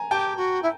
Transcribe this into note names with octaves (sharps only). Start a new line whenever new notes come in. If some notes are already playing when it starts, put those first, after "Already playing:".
Already playing: G#5 A#5
G4 G5 A5
F#4
E4